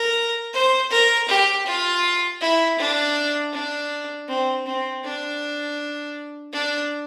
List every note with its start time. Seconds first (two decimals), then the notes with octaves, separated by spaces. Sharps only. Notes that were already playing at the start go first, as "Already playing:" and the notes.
Already playing: A#4
0.54 C5
0.91 A#4
1.28 G4
1.66 F4
2.41 E4
2.78 D4
3.53 D4
4.28 C4
4.66 C4
5.03 D4
6.53 D4